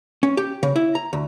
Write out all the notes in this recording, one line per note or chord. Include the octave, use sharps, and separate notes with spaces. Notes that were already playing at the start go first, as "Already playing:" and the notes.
C#4
G4
C#3
E4
A#5
D2